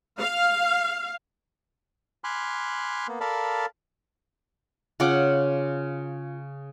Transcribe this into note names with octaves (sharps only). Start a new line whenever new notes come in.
F5
G#5 B5 C6 D6 F6 F#6
A#3 B3
A4 A#4 D5 F5 A5 B5
C#3 F4 F#5 D6